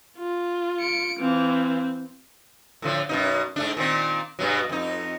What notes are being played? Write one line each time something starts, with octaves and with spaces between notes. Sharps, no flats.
F4
C#7 D7
E3 C4 F5
A2 D3 F3
F#2 B2 D#4
G#2 A3 D4
A#2 D#3 C4
G2 B2 F#3
F2 D#4